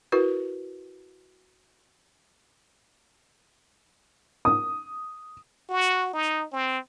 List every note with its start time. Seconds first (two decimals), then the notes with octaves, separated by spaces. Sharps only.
0.12 E4 F#4 A#4 B4
4.45 D#6
5.69 F#4
6.13 D#4
6.53 C4